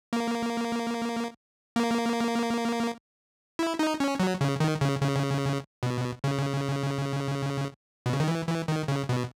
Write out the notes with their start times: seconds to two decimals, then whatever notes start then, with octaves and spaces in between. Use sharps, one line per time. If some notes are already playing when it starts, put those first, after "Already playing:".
0.13 A#3
1.76 A#3
3.59 E4
3.79 D#4
4.00 C#4
4.20 F#3
4.41 C#3
4.60 D#3
4.81 C#3
5.01 C#3
5.83 B2
6.24 C#3
8.06 B2
8.13 C#3
8.20 D#3
8.28 E3
8.47 E3
8.68 D#3
8.88 C#3
9.09 B2